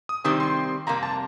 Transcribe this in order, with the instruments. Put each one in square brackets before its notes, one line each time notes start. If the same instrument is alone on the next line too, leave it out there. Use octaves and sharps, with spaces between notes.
[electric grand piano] D#6
[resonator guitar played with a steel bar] C3 D#3 G3 C4 G4 [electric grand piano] D#6
[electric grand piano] C6
[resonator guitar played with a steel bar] F2 C3 G3 A#3 [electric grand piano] A#5
[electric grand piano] A5